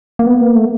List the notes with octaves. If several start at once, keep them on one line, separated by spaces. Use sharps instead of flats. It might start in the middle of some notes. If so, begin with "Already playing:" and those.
A#3
B3
A#3
A3